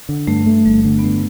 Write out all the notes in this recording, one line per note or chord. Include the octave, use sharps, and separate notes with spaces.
D3
G2 A3
A3
G1 G3
D3
B3
G2 A3